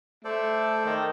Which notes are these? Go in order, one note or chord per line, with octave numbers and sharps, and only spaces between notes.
A3 A4 C5 D5
D#3